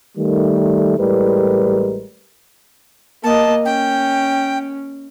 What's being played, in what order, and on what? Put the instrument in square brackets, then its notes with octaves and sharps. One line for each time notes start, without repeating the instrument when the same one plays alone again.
[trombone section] D#3 G3 A3
A1 A2 G3 G#3 A#4 B4
[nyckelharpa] A#3 D#5 [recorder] A5
[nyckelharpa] C#4 [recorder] G5